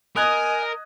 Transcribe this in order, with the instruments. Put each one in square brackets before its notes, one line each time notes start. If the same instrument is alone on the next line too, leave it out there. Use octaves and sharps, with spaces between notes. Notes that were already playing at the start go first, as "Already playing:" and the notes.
[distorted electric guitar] A#4 [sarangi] D#5 [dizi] G#5 [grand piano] D#6 F#6 G#6